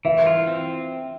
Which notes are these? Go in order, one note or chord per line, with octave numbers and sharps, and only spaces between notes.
E3 E5
F4
C4